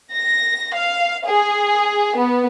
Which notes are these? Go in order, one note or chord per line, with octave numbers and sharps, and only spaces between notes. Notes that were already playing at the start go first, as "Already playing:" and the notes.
A#6
F5
G#4
B3